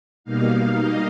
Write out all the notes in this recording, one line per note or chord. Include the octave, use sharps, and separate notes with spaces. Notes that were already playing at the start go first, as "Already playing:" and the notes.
B2 G3 A#3 D#4 F5
D#5